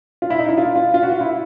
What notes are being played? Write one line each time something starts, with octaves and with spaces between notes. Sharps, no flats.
F4
E4
D#4
E4
F4
F4
F4
F#4
F4
E4